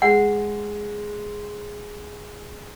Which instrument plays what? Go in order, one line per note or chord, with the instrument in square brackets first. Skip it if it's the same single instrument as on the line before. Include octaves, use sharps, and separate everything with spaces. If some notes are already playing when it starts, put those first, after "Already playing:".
[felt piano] G#3 [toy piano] F#5